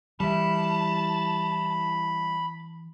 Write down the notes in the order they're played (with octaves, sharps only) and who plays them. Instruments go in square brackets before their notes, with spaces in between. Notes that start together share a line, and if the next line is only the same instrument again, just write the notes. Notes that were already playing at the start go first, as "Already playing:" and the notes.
[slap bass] E3 [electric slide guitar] G3 E4 [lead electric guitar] A5 [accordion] B5